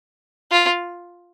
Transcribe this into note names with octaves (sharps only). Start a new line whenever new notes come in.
F4